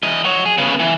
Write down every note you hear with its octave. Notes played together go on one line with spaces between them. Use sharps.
E3 D#5
F#3 C#5
G#4
C#3 B3
E3